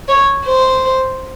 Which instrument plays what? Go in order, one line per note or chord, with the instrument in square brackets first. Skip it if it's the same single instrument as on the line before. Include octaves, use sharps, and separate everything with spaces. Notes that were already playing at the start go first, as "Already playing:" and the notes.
[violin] C#5
C5